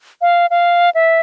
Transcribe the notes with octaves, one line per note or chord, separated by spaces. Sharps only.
F5
F5
E5